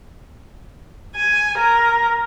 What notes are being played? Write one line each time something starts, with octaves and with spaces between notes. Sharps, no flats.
G#5
A#4